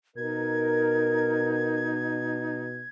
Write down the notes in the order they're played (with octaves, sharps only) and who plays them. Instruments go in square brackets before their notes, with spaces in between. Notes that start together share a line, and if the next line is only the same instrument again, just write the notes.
[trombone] B2 [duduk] D#4 [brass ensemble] A#4 [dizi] G#6